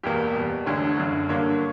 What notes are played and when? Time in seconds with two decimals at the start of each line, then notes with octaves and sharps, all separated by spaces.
0.03 E1 E2 B2 A#3 G4
0.35 E2 B2 G3
0.66 E1 D2 D3 C#5
0.98 F#1 F#2 D3
1.29 G1 G2 D3 A#3 C#5